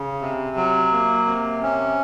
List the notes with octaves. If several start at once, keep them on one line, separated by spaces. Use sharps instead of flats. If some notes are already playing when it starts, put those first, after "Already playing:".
Already playing: C#3
C3
F#3
A#3
C3
C#4